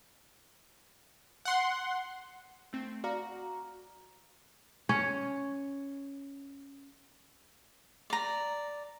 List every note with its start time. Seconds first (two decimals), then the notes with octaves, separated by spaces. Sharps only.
1.45 F#5 C6
2.73 A3 C4
3.04 F#4 D5 F5 A#5
4.89 C#4 C#5
8.10 D5 A#5